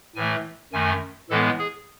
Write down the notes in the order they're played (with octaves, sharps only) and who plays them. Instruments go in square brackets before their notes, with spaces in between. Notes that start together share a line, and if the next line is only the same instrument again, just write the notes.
[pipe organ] A2 E3 A3 G#5
F#2 D#3 A3 G#5
A2 E3 G#3 B3 A4
G#4